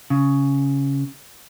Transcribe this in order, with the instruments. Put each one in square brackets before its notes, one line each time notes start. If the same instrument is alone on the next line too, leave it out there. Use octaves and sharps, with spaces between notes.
[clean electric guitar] C#3